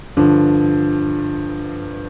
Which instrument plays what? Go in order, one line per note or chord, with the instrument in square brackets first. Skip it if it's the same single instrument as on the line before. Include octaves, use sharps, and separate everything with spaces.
[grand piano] G2 D3 F3